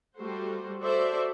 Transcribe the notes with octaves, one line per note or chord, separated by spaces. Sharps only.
G3 A3 F#4 C5
F#4 A4 C5 D5 E5